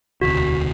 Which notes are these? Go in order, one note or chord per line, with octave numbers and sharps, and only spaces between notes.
E1 D2 C3 F#4